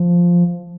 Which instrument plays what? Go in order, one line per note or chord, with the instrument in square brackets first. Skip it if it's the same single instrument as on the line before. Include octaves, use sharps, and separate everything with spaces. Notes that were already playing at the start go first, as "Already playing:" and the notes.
Already playing: [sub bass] F3